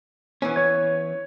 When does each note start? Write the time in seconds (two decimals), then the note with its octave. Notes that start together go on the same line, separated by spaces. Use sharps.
0.42 E3 B3 C#4
0.56 C#5 G#6